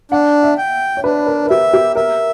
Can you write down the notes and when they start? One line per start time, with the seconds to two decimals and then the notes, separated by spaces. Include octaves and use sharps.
0.11 D4 F#5
0.43 E5
0.58 G5
0.97 C#5
1.04 D4 B4
1.27 A#4
1.45 A#4
1.50 G4 E5
1.73 G4
1.95 A#4 E5